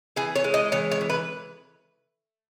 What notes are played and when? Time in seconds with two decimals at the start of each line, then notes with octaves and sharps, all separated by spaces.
0.16 E3 G#4
0.36 C#5
0.44 G#3
0.54 D#5
0.72 E3 C#5
0.92 C#5
1.01 E3
1.10 B4